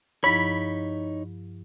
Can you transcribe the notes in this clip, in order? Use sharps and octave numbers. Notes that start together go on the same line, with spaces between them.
G2 F3 D#4 E4 C#5 B5